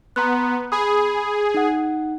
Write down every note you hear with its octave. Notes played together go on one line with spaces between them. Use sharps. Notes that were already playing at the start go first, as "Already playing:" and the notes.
B3 A#5 C6 F#6
G#4 B5 D#6
D#4 F#5